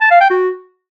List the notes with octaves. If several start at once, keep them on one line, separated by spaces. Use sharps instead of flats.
A5
F5
G5
F#4